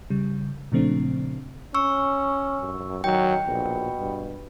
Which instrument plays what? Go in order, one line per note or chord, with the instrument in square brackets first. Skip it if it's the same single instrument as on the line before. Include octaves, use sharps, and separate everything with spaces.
[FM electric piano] C#3 G3
A#2 C#3 F3 A3 C4 D4
[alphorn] C#4 [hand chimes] C#6 E6
[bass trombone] F#2
[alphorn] D#3 [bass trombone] F#3 [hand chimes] G5
[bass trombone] A#1 [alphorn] B2
[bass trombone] G2